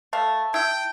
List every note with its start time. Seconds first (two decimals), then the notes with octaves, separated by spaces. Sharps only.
0.13 A3 F5 A5
0.54 E4 G5